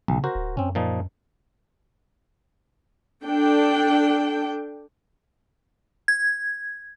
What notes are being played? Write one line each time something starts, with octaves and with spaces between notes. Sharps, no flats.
B1 C#3
F#4 A#4 C5
D1
F#2 C4 C#4
A#2 F3 D#4
D4 A4 G5
G#6